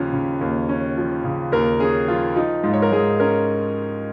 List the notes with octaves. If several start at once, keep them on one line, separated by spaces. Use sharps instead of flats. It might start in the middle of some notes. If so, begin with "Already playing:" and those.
Already playing: D#2 C#3 F3 C#4 C#5
C#3
D#2
C#4
F3
C#3
D#2 A#4
C#4 G#4
F3 F4
F3 D#4
G#2 F4
C#5
A#4
G#2 G#4
C#4 A#4